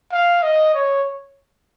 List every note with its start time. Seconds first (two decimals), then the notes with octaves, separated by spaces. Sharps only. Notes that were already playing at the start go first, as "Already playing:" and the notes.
0.12 F5
0.43 D#5
0.74 C#5